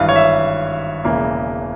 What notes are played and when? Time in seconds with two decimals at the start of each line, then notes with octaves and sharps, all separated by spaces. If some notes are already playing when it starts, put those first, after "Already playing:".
Already playing: G#1 G2 E3 F5
0.09 C#5
0.16 E5
1.05 E1 E2 C#3 E3 A#3